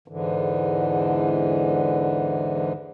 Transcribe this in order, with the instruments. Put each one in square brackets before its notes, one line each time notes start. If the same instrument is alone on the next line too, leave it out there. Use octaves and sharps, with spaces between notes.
[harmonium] E2 G#2 D3 E3